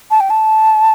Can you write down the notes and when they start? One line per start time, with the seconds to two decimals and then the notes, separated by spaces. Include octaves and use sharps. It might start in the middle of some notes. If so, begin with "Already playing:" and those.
0.11 A5
0.20 G5
0.30 A5